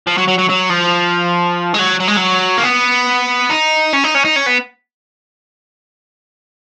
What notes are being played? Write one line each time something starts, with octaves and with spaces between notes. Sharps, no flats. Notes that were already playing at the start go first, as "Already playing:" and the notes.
F3
F#3
F#3
F#3
F#3
F3
G#3
F#3
F#3
G#3
F#3
A#3
B3
D#4
C#4
D#4
C#4
D#4
C#4
B3